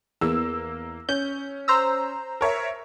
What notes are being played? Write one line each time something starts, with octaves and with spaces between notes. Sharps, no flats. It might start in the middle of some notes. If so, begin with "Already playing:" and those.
E2 A#3 E6
C#4 G6
C5 A#5 E6
A#4 C#5 E5